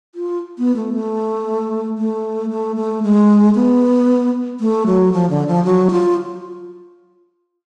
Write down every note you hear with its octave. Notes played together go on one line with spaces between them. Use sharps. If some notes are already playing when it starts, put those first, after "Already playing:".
F4
B3
A3
A3
A3
A3
A3
G#3
B3
A3
F#3
F3
D3
F3
F#3
F4